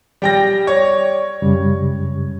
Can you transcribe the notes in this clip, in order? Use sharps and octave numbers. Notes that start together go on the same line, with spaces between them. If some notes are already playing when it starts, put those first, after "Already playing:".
G3 G5 A#6
C#5 D5
F#2 C#3 G3